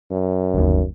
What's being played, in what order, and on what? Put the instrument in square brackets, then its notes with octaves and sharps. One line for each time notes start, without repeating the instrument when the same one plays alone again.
[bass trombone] F#2
[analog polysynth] G1 D#2